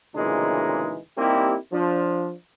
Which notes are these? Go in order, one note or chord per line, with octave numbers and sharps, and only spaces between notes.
D2 A#2 C#3 E3 G#3 D#4
G3 A#3 C4 D#4 E4 G4
F3 D4